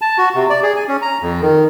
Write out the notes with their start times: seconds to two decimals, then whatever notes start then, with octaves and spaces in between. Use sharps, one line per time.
0.01 A5
0.18 F#4
0.35 C3
0.50 D5
0.63 G#4
0.76 G#5
0.88 C#4
1.02 A#5
1.22 F2
1.41 D#3